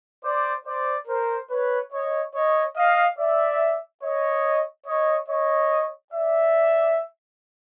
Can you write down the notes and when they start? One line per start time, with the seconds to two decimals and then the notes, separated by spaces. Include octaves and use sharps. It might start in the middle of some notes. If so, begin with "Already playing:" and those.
0.23 C5 D5
0.66 C5 D5
1.08 A#4 C5
1.50 B4 C#5
1.92 C#5 D#5
2.34 C#5 D#5
2.76 D#5 F5
3.18 D5 E5
4.02 C#5 D#5
4.86 C#5 D#5
5.28 C#5 D#5
6.12 D5 E5